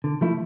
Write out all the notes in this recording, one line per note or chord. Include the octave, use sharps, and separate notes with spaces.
D3
F3 A3 E4